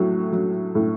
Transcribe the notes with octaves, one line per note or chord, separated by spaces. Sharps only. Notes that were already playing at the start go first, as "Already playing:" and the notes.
Already playing: A2 F#3
F#3
A2